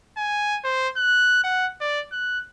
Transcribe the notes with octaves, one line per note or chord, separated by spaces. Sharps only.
G#5
C5
F#6
F#5
D5
F#6